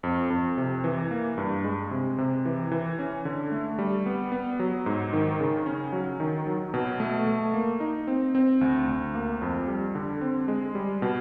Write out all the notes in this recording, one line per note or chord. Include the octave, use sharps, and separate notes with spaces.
F2
F2
C3
E3
A#3
G2
G#3
C3
C3
E3
E3
C#4
D3
A3
G3
B3
B3
F#3
G#2
D#3
C#3
C#4
F#3
D#3
F#3
B2
A3
A3
A#3
D#4
C4
C4
D2
D2
A#3
F2
G3
D3
C4
G#3
G3
B2